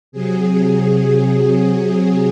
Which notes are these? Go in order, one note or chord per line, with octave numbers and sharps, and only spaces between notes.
C3 F#3 G#4
G#4
G#4